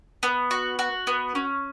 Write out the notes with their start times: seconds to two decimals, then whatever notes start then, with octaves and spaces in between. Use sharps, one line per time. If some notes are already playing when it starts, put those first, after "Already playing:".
0.23 B3
0.51 F#4
0.79 F#4
1.07 B3
1.35 C#4